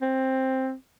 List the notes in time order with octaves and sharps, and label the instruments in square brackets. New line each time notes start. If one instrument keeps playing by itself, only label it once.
[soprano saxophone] C4